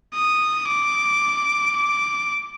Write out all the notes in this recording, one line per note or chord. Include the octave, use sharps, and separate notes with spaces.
D#6
D6
D6